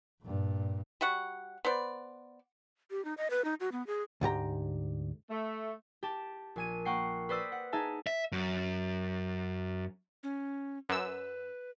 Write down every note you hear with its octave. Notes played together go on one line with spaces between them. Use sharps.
G2 A#2
G3 F#4 F#5 C#6
B3 C5 D5
G4
D#4
D#5
B4
D#4
F#4
B3
G#4
D2 G#2 G4 A#5
A3
G4 A5
A#1 G#5 D#7
A#3 F#5 G5 C#6 C7
B4 C5 D5 D#6 E6 B6
F#5
D#4 G#4 E5 G#5 A5
E5
F#2
C#4
F#2 B4 E6